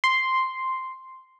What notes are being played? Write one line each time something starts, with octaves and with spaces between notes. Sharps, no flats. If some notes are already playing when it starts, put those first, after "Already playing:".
C6